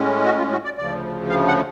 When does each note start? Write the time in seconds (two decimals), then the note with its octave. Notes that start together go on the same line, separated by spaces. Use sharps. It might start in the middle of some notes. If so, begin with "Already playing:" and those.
Already playing: A2 G#3 C#4
0.25 F#4
0.38 F4
0.52 F#4
0.65 D5
0.78 D2 C#3 F3 D5
1.30 F5
1.48 F#5